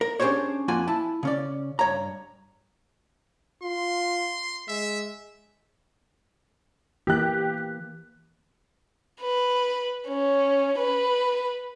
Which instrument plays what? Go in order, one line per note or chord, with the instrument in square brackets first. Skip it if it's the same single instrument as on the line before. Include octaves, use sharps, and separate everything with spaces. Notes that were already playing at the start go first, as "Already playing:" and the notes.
[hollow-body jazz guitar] A#4
C#4 D4 G4 G#4 C5 C#5
F2 A#3 F4 F#4 G#5
E4 A5
C#3 C#4 D5
G2 C#5 A#5
[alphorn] F4 [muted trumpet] C6
[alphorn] G#3 [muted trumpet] E5
[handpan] E3 A#3 [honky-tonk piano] G4 F#6
[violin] B4
C#4
B4